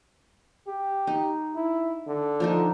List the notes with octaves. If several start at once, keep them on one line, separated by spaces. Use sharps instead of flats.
G4
D#4
E4
D3
F3 D4 D#4